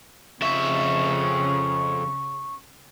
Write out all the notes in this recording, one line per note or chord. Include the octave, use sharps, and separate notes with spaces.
F2 C#3 E5 C#6